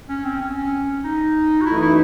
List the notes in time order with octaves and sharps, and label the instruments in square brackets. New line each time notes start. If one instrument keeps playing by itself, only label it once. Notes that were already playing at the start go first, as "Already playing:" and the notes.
[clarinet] C#4
C4
C#4
D#4
F#4
[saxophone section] F#2 E3 A3 D#4 [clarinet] E4
[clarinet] E4